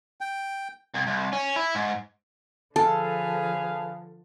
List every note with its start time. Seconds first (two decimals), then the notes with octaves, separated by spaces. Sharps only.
0.21 G5
0.94 C2
1.07 C2
1.33 C#4
1.57 E4
1.75 G#2
2.76 D3 F3 G#4 A4 B4 F5 A5